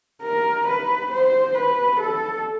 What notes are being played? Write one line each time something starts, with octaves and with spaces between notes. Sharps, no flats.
A#4
B4
C5
B4
A4